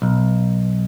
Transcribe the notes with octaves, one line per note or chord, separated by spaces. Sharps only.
B1